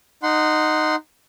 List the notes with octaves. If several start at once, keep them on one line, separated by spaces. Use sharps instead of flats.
D#4 F#5 C6